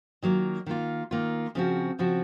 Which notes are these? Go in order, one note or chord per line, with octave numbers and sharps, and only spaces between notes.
D#3 F#3 A#3 F4
D#3 A#3 F4
D#3 A#3 F4
C#3 F3 C4 F#4
C#3 F3 C4 F#4